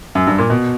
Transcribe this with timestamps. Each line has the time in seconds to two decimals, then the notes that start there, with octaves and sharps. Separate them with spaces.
0.15 F#2
0.27 G2
0.38 A#2
0.50 B2